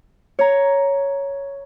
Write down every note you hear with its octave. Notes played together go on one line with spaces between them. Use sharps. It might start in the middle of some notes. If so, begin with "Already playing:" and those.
C#5 A#5